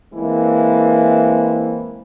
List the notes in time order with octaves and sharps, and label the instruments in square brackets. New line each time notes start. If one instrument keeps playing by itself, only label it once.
[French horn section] E3 G#3 A#3 C4 E4